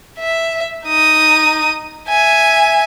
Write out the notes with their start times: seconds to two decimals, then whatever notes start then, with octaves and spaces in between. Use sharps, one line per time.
0.19 E5
0.86 D#4 D#6
2.09 E5 G#5